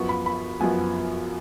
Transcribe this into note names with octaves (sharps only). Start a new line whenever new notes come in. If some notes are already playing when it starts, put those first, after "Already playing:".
Already playing: F#2 F3 B3 C#6
B5
B5
F#2 F3 B3 G#5